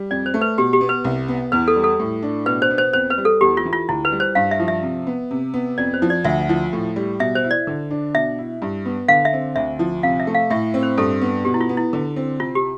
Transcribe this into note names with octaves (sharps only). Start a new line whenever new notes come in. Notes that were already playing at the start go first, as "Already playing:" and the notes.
Already playing: G3
F2 D5
C5
A3
B4
B2 G4
G4
B3
B4
C2
B3
E2 B4
A4
G3
A4
A2
D4
B2 B4
C5
B3
C5
F2 C5
B4
G3
A4
E2 G4
F4
E3
F4
D2 E4
B4
G3
C5
G2 F5
E5
F3
E5
C3
B3
C3
B3
F2 D5
C5
F3
D5
D2 E5
F3
A2
G3
B2 E5
C5
E4
D5
D3
D4
B2 E5
E4
G2
B3
D3 F5
E5
C4
D2 E5
F3
C3 F5
E5
A3
F5
A2 E5
C4
C5
G2 A4
B3
B2 G4
E4
F4
B3
E4
D3
C4
C3 F4
G4